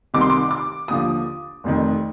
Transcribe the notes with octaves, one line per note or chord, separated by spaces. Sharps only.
C2 C3 D#3 D6
C6
D6
D6
D#2 D3 F3 D#6
F1 F2 D#3